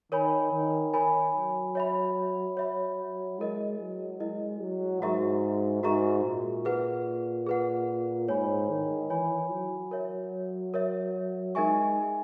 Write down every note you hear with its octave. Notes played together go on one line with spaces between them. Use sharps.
D#3 A#4 C#5 G#5 B5
D#3
A#4 C#5 G#5 B5
F#3
C#5 E5 B5
C#5 E5 B5
G#3 E4 A#4 D#5
F#3
G#3 E4 A#4 D#5
F#3
G#2 F#4 A#4 E5 A#5 C#6
G#2 F#4 A#4 E5 A#5 C#6
A#2
G#4 B4 F#5
G#4 B4 F#5
G#2 C#5 G#5 B5
D#3
E3 C#5 G#5 B5
F#3
A#4 C#5 E5
A#4 C#5 E5
G#3 D#4 A#4 E5 G#5 C#6